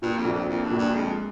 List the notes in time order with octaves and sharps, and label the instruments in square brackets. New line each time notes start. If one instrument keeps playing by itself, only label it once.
[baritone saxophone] G2 [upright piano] A#2
[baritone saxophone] F2
[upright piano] A#1
[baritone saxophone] F2
[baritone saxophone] F2 [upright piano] A#2
[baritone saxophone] G2
[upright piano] A#1
[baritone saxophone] G2
[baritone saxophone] F2 [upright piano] G#3